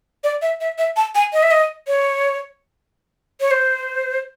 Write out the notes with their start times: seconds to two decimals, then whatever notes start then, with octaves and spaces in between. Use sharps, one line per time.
0.24 D5
0.42 E5
0.61 E5
0.78 E5
0.96 A5
1.15 G#5
1.33 D#5
1.43 E5
1.51 D#5
1.87 C#5
3.41 C#5
3.51 C5